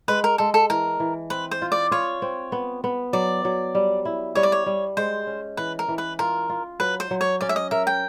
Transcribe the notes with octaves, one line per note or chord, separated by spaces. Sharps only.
G#3 B4
A#4
G#3 A4
A4
E3 A#4
E3
C4 B4
C5
F4
D5
F4 C#5
C4
B3
B3
F#3 D5
F#3
G3
E4
G3 C#5
D5
C#5
G3
G#3 C5
C#4
E3 B4
A#4
E3
B4
F4 A#4
F4
F#3 B4
C5
F#3
C#5
C#4 D5
E5
D#5
A#4 E5
G5